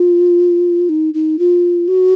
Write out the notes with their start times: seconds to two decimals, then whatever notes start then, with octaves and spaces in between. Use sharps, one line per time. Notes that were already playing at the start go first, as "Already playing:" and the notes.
Already playing: F4
0.89 D#4
1.14 D#4
1.39 F4
1.88 F#4